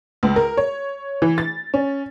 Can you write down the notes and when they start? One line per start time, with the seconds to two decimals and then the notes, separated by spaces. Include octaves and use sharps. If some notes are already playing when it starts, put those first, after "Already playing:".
0.23 C#2
0.36 A#4
0.57 C#5
1.22 E3
1.38 A6
1.74 C#4